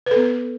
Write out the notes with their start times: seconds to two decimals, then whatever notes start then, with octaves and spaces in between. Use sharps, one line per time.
0.06 B4
0.11 A4
0.16 B3